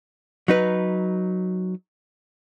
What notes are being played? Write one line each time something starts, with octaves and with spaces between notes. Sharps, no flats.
F#3 D#4 B4